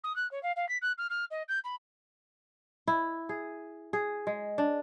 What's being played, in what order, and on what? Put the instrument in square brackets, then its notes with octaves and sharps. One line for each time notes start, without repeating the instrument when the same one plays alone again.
[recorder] D#6
F#6
C#5
F5
F5
B6
F#6
F6
F6
D#5
G6
B5
[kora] E4
G#4
G#4
G#3
D4